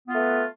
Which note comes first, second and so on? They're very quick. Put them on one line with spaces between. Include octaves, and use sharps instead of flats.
B3 F4 A3 B4